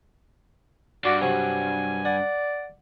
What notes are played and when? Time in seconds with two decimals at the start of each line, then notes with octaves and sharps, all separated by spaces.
1.05 G2 F#4 D5
1.21 C3 F#3 G#5 C#6
2.05 D5 F#5